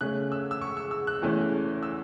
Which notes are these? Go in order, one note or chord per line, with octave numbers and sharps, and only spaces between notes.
C#3 A3 C#4 F#6
E6
E6
C#6
E6
E6
F#6
E2 E3 A3 C#4
E6